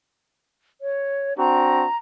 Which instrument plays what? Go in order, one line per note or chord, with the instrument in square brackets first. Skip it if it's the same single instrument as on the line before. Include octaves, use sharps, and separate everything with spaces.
[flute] C#5
[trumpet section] C4 D4 F#4 [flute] A#5